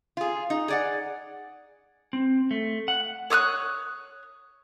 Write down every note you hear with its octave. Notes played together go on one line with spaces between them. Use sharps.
F4 G#4
D#4
G#4 D5 F#5
C4
A3
F#5
C#5 D#6 F6 F#6